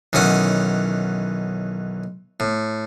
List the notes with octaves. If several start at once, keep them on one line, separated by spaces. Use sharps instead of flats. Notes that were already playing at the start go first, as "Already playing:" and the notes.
B1 D#3 E3 C#4 F#5
A2